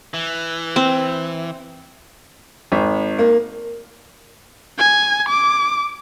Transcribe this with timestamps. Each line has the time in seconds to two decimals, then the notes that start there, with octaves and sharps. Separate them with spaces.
0.14 E3
0.76 C4
2.72 G#1
3.19 A#3
4.78 G#5
5.29 D6